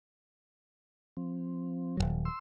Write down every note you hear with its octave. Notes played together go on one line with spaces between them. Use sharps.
F3 C4
D#1 C2 F#3
C6 E6